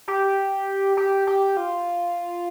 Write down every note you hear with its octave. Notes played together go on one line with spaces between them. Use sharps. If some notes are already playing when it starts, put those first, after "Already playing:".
G4
G4
G4
F4